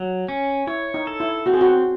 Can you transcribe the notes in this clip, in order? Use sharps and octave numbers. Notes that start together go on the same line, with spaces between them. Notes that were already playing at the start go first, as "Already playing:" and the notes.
Already playing: F#3
C#4
E4 C#5
D#4
A4
E4
C4 F#4
G#4
F#4